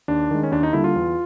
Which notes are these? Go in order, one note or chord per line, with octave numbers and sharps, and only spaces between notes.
D#2 D4
D#3 G#3
C#4
D#2 D4
D#4
D3 G3 A#3 E4
F4
E2